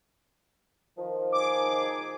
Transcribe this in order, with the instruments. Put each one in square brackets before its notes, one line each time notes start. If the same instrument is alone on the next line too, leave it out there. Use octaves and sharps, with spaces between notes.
[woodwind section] D#3 F3
[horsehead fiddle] D#4 G#4 [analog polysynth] D6